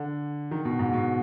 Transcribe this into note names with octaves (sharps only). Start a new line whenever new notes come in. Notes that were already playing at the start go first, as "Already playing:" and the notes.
Already playing: D3
D#3
B2
G#2
B2